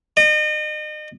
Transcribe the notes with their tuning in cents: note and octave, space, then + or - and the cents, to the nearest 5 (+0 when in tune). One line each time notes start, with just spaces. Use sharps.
D#5 -35